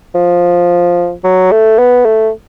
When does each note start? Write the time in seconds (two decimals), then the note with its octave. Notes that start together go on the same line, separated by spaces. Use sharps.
0.15 F3
1.24 F#3
1.51 A3
1.78 B3
2.05 A3